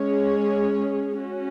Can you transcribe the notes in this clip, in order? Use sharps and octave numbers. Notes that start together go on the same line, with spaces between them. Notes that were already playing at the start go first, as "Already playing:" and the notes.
Already playing: G#3 C#4 G#4 C#5
C#4 F#4